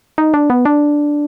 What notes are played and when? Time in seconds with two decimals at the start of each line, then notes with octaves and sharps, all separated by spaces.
0.18 D#4
0.34 D4
0.50 B3
0.65 D4